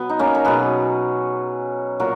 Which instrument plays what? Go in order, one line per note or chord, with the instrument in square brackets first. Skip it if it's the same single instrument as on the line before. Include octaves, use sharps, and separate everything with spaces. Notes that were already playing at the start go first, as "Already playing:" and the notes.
Already playing: [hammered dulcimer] B2 F#3 B3
D#4
A#3 C#4
A#4
B2 F#3 G#4 B4
A#2 F#3 F#4 A#4